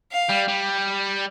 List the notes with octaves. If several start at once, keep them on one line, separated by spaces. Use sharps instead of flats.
F5
G3
G3